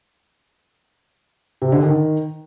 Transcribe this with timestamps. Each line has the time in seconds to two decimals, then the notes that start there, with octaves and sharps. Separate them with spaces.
1.62 C3
1.72 D3
1.83 D#3